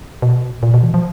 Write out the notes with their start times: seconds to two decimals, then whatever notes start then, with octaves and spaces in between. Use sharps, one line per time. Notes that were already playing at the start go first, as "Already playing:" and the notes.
0.22 B2
0.63 A#2
0.74 B2
0.83 E3
0.94 F3